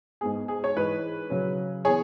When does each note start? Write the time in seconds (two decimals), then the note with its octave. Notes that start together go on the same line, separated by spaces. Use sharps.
0.21 G#2 G#3 B3 G#4
0.48 G#4
0.64 C#5
0.76 G#2 E3 G#3 B4
1.30 C#3 F#3 C#4
1.85 E3 B3 G#4 C#5